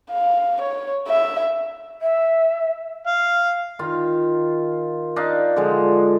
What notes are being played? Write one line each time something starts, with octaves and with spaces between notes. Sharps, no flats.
F5
C#5
E5
E5
F5
D#3 F4
D4 D#4 F5
D3 F3 G#3